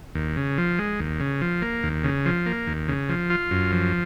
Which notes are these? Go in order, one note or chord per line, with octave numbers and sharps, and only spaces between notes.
D#2
C#3
F3
G#3
D#2
C#3
F3
A#3
D#2
C#3
F3
A#3
D#2
C#3
F3
F4
F#2
F3